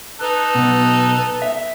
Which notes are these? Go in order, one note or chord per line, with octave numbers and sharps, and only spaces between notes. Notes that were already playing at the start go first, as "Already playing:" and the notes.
D#4 A4 B4
B1 B2
E5